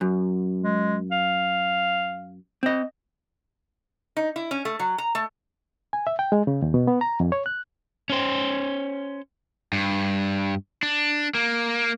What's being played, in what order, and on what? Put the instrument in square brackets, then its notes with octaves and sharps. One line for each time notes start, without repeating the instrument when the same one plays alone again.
[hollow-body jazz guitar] F#2
[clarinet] G#3
F5
[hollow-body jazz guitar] C4 D#5
[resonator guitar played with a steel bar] D#4
E4
C#4
A3
F#3
A#5
A3
[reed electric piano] G#5
E5
G5
G#3
C#3
D#2
B2
B3
A#5
F2
C#5
F#6
[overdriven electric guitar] C#4 C5
G2
D4
A#3